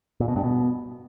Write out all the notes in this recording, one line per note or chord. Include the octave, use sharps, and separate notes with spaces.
A#2
B2
G2
B2